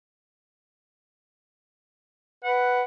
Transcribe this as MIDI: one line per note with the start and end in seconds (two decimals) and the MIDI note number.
2.44 2.82 71
2.44 2.84 78